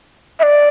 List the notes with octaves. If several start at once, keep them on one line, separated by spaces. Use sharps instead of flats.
E5
D5